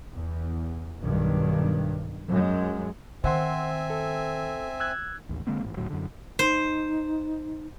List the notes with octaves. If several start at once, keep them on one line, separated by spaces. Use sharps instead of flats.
E2
B1 G2 D#3
F#2 G#3
D#3 C4 C5 E5 F#5 G#5 C6
A4
E6 F#6 G#6
A1 D#2
D3 G#3 A#3 C4
A1 G#2
D#1 D2 A2 F#3
F#2 D3
D#4 C5